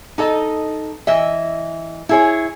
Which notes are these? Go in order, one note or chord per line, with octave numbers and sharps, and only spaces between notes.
D#4 A4 D#5
E3 D#5 E5
E4 G#4 C#5